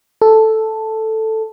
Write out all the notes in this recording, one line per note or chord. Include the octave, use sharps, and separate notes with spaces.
A4